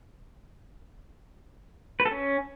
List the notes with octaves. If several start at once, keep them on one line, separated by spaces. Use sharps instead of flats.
B4
A4
C#4